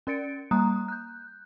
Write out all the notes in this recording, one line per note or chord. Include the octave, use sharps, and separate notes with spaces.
C#4 A#4 D5 A6 C#7 D7
G3 A#3 A#5 D#6 F#6
F#6 G6